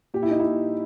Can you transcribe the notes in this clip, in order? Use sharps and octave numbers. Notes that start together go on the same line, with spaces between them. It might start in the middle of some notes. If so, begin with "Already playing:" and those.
A#2 G4
E4
D#4
E4
A#2